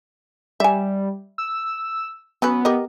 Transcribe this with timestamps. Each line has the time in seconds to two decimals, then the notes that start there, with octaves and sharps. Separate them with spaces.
0.60 G3 E5 G#5
1.38 E6
2.42 F#3 B3 C#4 B4
2.65 G4 A#4 D#5